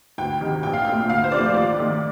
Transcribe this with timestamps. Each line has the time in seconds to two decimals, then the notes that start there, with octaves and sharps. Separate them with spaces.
0.18 D2 G5
0.41 C3 D#3
0.63 A#1 G5
0.73 F5
0.85 A#2 A3 G5
1.08 D2 F5
1.24 C5
1.31 C3 F3 A3 D5
1.54 D#2 D5
1.77 D#3 A3